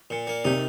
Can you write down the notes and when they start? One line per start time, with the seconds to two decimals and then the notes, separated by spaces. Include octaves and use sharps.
0.10 A#2
0.27 A#3
0.44 C3 D#4